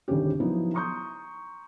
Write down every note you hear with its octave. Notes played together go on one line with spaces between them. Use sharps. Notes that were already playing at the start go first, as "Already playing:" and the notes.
D#1 G#1 D2 G#2 C#4 G4
F3 F#3 B3 D#4 E4
A#5 C6 C#6 D#6 G6